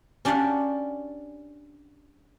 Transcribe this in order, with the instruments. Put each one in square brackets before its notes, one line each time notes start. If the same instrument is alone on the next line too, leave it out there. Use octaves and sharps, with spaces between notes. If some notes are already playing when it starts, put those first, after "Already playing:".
[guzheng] C#4 D4 G4 D5 F5 F#5